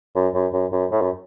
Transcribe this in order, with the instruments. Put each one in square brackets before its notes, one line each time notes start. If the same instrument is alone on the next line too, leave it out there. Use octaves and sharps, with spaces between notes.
[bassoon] F#2
F#2
F#2
F#2
A2
F#2